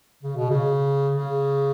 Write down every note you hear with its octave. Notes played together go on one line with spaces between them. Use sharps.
C#3
B2
C#3
C#3